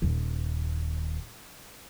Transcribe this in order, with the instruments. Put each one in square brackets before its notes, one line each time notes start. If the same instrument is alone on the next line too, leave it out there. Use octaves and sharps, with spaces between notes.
[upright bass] D#1 D#2